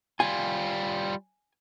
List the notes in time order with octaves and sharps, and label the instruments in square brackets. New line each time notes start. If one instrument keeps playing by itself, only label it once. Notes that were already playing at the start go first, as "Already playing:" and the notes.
[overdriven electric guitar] G3 F4 [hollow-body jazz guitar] G#5